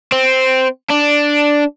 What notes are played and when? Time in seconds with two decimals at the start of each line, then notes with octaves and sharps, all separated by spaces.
0.12 C4
0.90 D4